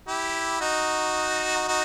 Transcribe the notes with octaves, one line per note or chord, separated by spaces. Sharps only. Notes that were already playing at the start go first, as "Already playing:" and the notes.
E4 G4
D#4 F#4
D#4 F#4